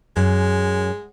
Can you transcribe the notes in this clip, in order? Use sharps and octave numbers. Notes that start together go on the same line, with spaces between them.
F#2 G#3